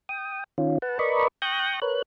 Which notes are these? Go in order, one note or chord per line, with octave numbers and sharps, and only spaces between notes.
G5 D#6
D#3 C#4 F4
B4 F#5 A5
A#4 B4 D5 D#5 B5 C#6
G5 C#6 D#6 F#6 G6 A#6
A#4 B4 C#5 F#6